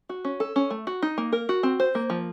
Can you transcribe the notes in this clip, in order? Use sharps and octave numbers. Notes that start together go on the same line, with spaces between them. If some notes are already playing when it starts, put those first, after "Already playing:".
F#4
C#4
A4
C#4
A3
F#4
D#4
A#3
A#4
F#4
C4
C5
A#3
F3